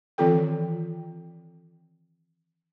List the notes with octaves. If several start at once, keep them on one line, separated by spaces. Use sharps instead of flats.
D#3 E3 C4 F4 A4 G5